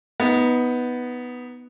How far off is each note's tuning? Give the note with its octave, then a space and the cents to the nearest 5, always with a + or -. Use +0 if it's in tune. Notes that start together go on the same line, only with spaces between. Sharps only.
B3 +0 D#4 +20